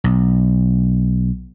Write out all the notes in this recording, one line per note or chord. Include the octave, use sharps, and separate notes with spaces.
B1